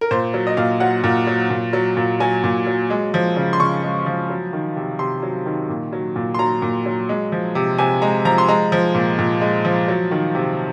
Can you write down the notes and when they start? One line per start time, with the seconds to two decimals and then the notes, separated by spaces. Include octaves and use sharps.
0.01 A#4
0.11 A#2 C5
0.34 F#3
0.47 D#5
0.57 A#2 F5
0.80 F#3 F#5
1.04 A#2
1.27 F#3
1.50 A#2
1.73 F#3
1.97 A#2
2.20 F#3 G#5
2.44 A#2
2.67 F#3
2.90 G#3
3.14 F3
3.37 C#3
3.53 C6
3.60 C#3 C#6
3.83 G#3
4.06 F3
4.30 F#3
4.53 D#3
4.76 C3
4.99 C3 C6
5.23 F#3
5.46 D#3
5.69 A#2
5.93 F#3
6.16 A#2
6.34 C6
6.39 F#3 A#5
6.62 A#2
6.86 F#3
7.09 G#3
7.32 F3
7.55 C3
7.78 C3 G#5
8.02 G#3 A#5
8.25 F3 A#5
8.38 C6
8.48 G#3 A#5
8.72 F3
8.95 A#2
9.19 A#2
9.41 G#3
9.65 F3
9.88 F#3
10.11 D#3
10.35 C3